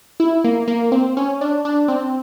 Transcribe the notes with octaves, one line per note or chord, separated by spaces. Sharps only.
E4
A#3
A#3
C4
C#4
D4
D4
C4